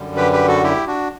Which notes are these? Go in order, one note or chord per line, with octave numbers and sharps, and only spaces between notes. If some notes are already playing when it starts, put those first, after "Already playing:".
Already playing: F#2 D3 G3
G4 B4
G4 B4
F#4 A4
E4 G4
D4 F#4